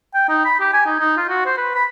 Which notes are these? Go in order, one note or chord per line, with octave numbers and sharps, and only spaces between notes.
G5
D#4
B5
G4
G#5
D#4
D#4
F4
F#4
C5
B4
B5